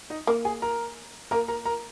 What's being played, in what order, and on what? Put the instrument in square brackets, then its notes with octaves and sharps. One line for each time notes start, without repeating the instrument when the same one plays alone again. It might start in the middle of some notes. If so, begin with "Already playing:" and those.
[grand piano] D#4 D#5
[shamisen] A#3 [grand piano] A#4
[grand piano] G#4 G#5
A#4 A#5
[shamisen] A#3 [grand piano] A#4 A#5
[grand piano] A#4 A#5
A#4 A#5